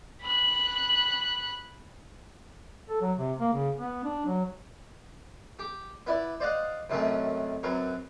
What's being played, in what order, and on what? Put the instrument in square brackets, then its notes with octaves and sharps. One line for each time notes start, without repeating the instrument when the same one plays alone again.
[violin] B5 F#6
[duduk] A4
F#3
C3
A#3
C#3
B3
D4
F#3
[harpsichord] G4 D6
B3 E4 D5
C5 D5 D#5 F5 F#5
F#2 C3 D#3 A3 C#4
F#2 B3 C4 A#4 C#6